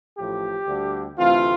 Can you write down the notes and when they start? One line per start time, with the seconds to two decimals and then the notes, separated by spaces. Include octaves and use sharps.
0.18 A1 A2 F3 G4
0.67 D2 D3 G3
1.17 D2 C3 E3 A3 C4 F4